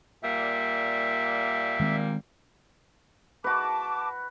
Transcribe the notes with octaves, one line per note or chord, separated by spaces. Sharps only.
A#2 G3 A#3 E5
D#3 G#3 C4
F#4 B4 A5 D6